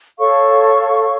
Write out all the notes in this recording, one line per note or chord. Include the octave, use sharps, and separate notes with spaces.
A4 C#5 F5 C#6